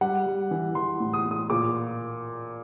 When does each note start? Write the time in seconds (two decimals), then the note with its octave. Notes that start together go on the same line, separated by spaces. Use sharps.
0.01 G3 F#5
0.26 G3
0.51 E3
0.75 E3 C6
1.00 A2
1.13 D#6
1.26 A2
1.31 D#6
1.50 A#2 D6